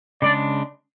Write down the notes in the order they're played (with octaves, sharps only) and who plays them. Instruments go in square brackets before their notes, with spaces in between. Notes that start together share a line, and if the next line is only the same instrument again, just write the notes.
[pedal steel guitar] C#3 G#3 D4 [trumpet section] D5